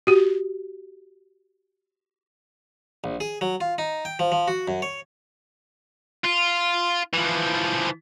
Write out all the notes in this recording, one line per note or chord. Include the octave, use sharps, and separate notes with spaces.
F#4 G4
A#1
G#4
F#3
F4
D#4
G5
F3
F3
F#4
F#2
C#5
F4
E3 F3